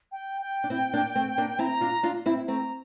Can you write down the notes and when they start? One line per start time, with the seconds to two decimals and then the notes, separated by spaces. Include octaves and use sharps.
0.12 G5
0.42 G5
0.64 D4
0.70 C4 E4
0.93 A#3 D4
1.15 A3 C4
1.38 A#3 D4
1.59 C4 E4 A#5
1.81 D4 F4
2.03 D4 F4
2.26 C4 E4
2.48 A3 C4 A#5